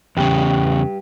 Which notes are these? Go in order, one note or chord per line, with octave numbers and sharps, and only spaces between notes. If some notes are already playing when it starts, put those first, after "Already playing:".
E2 G2 C#3 G4